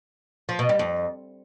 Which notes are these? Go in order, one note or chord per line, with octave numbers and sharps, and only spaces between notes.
F3
B2
G3
F2